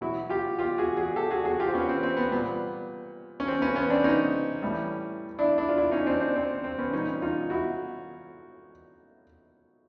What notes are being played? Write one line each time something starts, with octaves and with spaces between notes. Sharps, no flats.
B2 F#3 E4 F#4
F4 G4
F4 G4
F#4 G#4
F#4 G#4
G4 A4
F#4 G#4
F#4 G#4
F4 G4
C4
B3 C#4
C4
C4
B3
A#2 G3 B3
C#4
C4
B3 C#4
B3 C#4
C4 D4
C#4 D#4
A2 E3 G3
D4 E4
D4 E4
F4
D4 E4
C#4 D#4
C4 D4
C4 D4
C4
C4
B3 C#4
A#2 G3 C#4 D#4
D#4 F4
E4 F#4